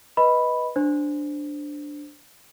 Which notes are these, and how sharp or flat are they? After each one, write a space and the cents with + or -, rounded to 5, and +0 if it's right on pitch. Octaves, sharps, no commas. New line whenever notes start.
B4 -10 D#5 +10 B5 +0
D4 +0 C5 -5